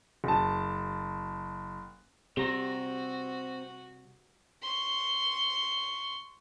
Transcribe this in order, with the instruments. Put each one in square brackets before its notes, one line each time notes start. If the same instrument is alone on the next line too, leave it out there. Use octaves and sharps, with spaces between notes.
[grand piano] F#1 A5
[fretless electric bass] C3 G3 [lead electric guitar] C4 A#5 [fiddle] F#4 [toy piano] G4
[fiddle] C6 C#6